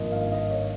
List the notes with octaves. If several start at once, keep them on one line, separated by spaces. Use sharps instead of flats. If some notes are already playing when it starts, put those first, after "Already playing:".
Already playing: G#1 G2 F3 A#3 D#5
F5
D#5
C#5